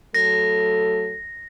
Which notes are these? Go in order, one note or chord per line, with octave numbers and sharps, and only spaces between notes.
F#3 A3 A4 A#6